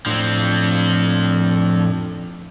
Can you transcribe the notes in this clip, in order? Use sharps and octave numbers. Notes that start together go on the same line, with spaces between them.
A2 F3 C4 D4